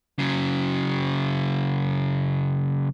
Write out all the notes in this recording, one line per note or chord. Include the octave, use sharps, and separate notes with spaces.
C#3 F#3